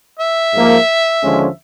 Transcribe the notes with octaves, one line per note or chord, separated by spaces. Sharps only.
E5
G#2 F3 A#3
D#2 D3 F3 G#3 C#4